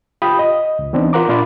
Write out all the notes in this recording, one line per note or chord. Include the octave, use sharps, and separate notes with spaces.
F4 G4 F5 G5 B5 D#6
D#5
C#2
E3 B3 C4 D4 D#4
F4 A#4 F#5 A#5 D6
A#2 D4 F4 B5 D6